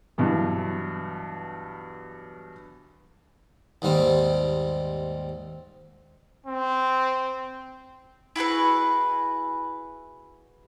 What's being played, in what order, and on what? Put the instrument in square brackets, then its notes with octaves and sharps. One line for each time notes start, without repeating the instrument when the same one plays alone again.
[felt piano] G2 B2 E3 F#3
[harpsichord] D#2 G#2 G3 A#3 C4
[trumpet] C4
[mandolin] E4 F#4 G#4 B4